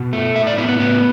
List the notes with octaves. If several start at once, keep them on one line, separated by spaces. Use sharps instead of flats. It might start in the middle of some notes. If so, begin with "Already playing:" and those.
Already playing: B2
A3
A2 E5
D5
B3 E4
B3
A2 B3